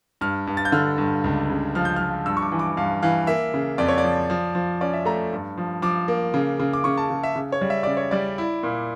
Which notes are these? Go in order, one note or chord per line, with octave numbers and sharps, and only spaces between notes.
G2 F6
G2
A6
G6
D3 F6
G2
C#2
C#3
F3 F6
G6
F3 F6
G2 E6
C#6
D6
E3
D6
G2 F5
E3 F5
A#3 E5
C#3
F2 D5
C#5
D5
F3
F3
F3
C#4 D5
E5
A3 A#5
G2
F3
F3 D6
A#3
C#3
C#3
D6
C#3 C#6
A5
C#3
E5
C#3
C#5
G3
E5
C#3 D5
C#5
G3 D5
E4
A#2